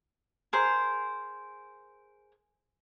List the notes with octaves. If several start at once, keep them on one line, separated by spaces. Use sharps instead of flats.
G#4 A#4 C5